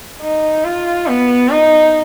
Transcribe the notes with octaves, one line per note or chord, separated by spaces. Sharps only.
D#4
F4
B3
D#4